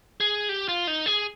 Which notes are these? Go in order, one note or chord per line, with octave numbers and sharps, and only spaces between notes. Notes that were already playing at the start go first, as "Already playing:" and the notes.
G#4
G4
F4
D#4
G#4